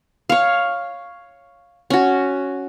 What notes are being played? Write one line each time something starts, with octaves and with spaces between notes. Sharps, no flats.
C#5 F5
C#4 F#4